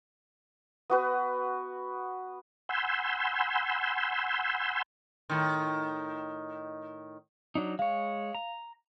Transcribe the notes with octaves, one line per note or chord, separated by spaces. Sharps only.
B3 F#4 B4
F#5 G#5 B5 C6 E6 G6
A2 D#3
F#3 D4 D#4
G#3 C#5 F5
A#5